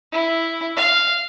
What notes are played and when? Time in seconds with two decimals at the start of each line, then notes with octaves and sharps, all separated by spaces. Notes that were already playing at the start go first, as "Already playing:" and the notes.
0.12 E4
0.77 F5